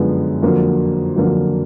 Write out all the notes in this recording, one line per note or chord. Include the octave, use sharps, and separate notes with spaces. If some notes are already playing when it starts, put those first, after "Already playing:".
Already playing: F#2 D3 F3 G#3 B3
F2 D3 F#3 A#3
F2 D3 F#3 A#3